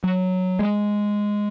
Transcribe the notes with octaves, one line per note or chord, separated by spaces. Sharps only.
F#3
G#3